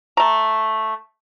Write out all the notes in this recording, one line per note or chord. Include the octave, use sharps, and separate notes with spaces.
A3 A#5